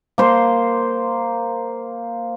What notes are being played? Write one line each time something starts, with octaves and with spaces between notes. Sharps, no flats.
A#3 C5 C6